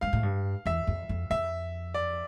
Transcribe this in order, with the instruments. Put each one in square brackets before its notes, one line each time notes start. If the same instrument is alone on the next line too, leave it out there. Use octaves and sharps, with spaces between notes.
[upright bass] G2 [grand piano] F5
[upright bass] A2
G2
[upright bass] E2 [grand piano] E5
[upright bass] F2
F2
[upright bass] F2 [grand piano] E5
[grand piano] D5